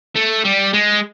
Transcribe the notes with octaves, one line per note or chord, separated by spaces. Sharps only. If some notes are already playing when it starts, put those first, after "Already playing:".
A3
G3
G#3